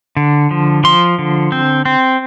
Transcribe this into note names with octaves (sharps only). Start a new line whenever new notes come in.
D3
F3
F3 C6
D3
C4
C4